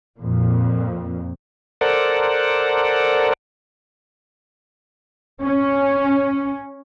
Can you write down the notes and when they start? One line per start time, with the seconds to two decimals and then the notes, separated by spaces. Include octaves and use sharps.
0.19 F2 A#2
1.81 A4 A#4 C5 D5 F#5
5.44 C#4